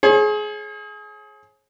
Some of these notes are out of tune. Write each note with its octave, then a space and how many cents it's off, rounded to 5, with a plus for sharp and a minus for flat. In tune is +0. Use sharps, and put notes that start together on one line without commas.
G#4 +25 C#5 -45